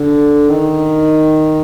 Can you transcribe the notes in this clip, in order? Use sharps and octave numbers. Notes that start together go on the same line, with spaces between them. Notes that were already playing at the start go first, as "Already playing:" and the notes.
Already playing: D3
D#3